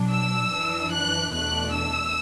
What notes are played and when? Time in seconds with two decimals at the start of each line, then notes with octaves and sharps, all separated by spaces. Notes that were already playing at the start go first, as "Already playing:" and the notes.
Already playing: B2 F#3 D4
0.11 E6
0.52 F#2 E3 D4
0.91 F#6
1.32 E2 B2 A3 D4 F#6
1.72 E6